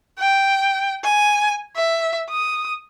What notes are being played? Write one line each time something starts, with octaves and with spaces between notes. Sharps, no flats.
G5
G#5
E5
D#6